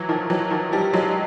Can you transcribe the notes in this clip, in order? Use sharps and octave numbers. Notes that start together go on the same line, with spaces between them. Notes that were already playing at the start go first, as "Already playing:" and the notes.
Already playing: E3 F#3
D#3 F3
E3 F#3
D#3 F3
F3 G3
F#3 G#3